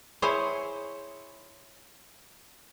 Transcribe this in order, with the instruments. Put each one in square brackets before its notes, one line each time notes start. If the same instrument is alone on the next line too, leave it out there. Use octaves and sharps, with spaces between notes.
[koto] E4 G#4 C5 C#5